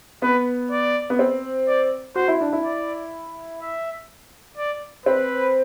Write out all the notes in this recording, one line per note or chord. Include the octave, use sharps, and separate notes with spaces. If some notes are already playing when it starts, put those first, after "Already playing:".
B3 B4
D5
B3
C4
D5
F#4 C5
E4
D4
E4
D5
E5
D5
C4 B4